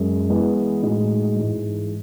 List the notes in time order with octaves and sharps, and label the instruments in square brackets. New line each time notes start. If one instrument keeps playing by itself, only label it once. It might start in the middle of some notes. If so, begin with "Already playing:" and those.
Already playing: [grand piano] F#2 G#3
E3 G#3 B3
A2 G#3 D#4 F#4
G#2 E3 G#3